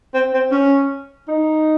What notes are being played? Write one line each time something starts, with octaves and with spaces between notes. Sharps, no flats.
C4
C4
C#4
D#4